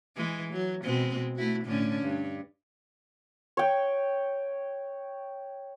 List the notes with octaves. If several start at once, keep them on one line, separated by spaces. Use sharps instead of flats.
E3 G#3
F#3
B2 G#3 C4
A3 E4 F#4
A2 D3 C#4
G2
C#5 G5